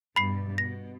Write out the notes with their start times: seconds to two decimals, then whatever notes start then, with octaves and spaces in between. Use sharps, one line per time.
0.16 G2 B2 G3 B5 C7
0.58 B2 A#6